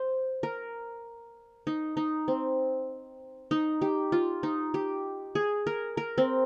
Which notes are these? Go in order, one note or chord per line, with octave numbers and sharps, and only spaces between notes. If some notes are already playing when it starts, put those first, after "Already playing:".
Already playing: C5
A#4
D#4
D#4
C4
D#4
G4
F4
D#4
G4
G#4
A#4
A#4
C4